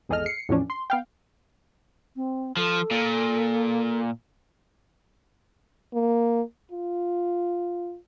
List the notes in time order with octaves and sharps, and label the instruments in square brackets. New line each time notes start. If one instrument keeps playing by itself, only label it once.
[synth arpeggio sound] G#1 E2 G#4 A4 D#5 F6
C7 C#7
E2 A2 E3 F3 C#4 D4
C6
B3 F5 G5
[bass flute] C4
[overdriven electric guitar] F3 [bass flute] A4
[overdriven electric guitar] A#2
[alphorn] A#3
F4